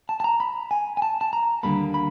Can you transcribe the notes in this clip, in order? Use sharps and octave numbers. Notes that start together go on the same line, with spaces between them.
A5
A5
A#5
B5
G#5
G#5
A5
A5
A#5
D#2 D3 G3 A#3 B5
B5